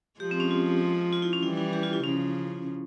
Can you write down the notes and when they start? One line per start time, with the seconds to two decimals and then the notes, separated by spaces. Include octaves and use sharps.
0.20 F3 G#3 G4
0.31 C4
0.40 C#4
0.51 F4
1.13 F4
1.22 E4
1.33 C#4
1.42 E3 G3 E4
1.57 E4
1.73 G4
1.83 F4
1.93 E4
2.04 C#3 F3 C#4